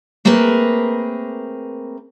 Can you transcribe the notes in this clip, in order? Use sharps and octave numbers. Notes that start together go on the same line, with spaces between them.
A3 A#3 C4 G#4 A#4 B4